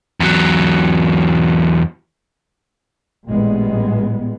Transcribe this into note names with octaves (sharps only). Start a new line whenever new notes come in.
E2 F#3
A1 A#2 G3 G#3 B3